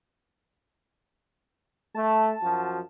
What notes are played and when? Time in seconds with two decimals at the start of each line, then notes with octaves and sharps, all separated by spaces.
1.95 A3 A5
2.42 F#2 F3 F#4